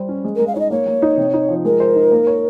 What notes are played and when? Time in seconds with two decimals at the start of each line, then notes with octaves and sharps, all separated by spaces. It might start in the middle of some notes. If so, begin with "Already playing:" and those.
Already playing: G3 C5
0.09 C#4
0.25 G#3
0.35 G#3 A#4
0.47 F5
0.55 D#4 C#5 D#5
0.71 A#3 C#5
0.87 A#3
1.02 D#4
1.17 C3
1.34 D#4
1.49 F3
1.65 G#3 A#4
1.80 C5
1.96 D#4
2.12 A#3
2.27 C#5